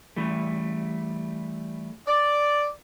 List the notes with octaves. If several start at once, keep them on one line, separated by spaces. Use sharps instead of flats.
E3 G3 A3
D5